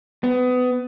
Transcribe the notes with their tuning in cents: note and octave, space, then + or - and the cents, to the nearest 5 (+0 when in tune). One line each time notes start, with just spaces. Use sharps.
B3 +25